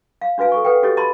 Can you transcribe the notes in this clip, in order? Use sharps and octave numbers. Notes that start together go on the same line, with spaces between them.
F5
D4 F#4 B4 F5 G#5
A4 G#5 C#6
A4 B4 F#5 G5
F#4 G4 A4 C#5 D#5
D#5 A5 B5 C6